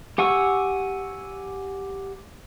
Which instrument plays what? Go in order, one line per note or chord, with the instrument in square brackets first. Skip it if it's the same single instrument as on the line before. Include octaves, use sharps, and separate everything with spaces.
[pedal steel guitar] G4 F#5 G#5 C#6 E6